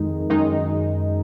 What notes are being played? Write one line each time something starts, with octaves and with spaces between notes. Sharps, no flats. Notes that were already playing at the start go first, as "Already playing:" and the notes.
Already playing: F2 D#3 G#3 D#4
F#2 D#3 G#3 D#4